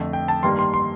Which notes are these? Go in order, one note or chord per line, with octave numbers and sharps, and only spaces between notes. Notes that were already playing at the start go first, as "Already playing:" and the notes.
Already playing: F2 D3 A3
G5
A5
G2 D#3 G3 A#3 C6
C6
C6